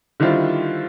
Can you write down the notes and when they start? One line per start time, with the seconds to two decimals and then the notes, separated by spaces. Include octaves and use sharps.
0.20 D3 D#3 G3 E4 F4 C5